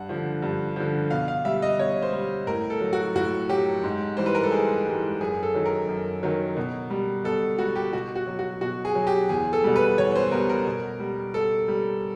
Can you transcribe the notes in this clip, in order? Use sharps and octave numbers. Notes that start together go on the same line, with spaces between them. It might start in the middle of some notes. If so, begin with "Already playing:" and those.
Already playing: G2 F#5
D3 F3
G2
D3 F3
B2 F5
F5
G3 E5
D#5
B2 C#5
C5
G3
A2 A#4
A4
F#3
F#4
A2 F#4
F#3 G4
G#2
E3 G3 C5
B4
A#4
A4
G#2 G#4
E3 G3
F#2 G#4
A4
D#3 F#3
A#4
F#2
D#3 F#3
B2
G3
B2 A4
G3 F#4
G4
B2 F#4
F#4
F#3
F#4
B2 F#4
G#4
F#3
G4
E2 G#4
A4
B2 G3
B4
E2 C#5
C5
B2 G3 A#4
A#4
B2
G3
B2 A4
G3